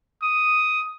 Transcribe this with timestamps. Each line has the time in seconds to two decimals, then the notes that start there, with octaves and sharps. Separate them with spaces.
0.23 D#6